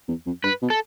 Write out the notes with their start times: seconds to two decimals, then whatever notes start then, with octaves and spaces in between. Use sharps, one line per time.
0.08 E2
0.26 F2
0.44 G2 B4
0.62 B2
0.70 A4